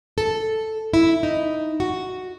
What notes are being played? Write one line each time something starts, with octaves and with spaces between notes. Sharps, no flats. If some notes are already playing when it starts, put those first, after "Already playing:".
A4
E4
D#4
F#4